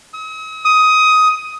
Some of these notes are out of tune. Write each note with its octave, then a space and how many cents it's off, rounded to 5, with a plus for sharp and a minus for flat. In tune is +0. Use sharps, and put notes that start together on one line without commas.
D#6 +45
D#6 +15